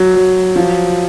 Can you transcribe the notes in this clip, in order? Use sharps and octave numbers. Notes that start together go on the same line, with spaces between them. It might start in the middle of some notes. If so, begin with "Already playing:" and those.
Already playing: F#3
F#3
F3